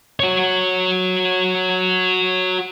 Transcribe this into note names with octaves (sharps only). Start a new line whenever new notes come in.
F#4 C#5